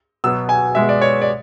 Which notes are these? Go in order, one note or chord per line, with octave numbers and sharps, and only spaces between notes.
B2 F#3 B3 E6
G#5
B2 G#3 B3 E5
D5
C#5
D5